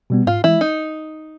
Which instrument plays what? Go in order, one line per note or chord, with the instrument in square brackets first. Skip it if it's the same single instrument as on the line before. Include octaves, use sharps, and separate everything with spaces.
[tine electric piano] B2 G3 B3
[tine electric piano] G#2 [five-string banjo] F4
[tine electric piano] E3 G#3 [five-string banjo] E4
[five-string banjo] D#4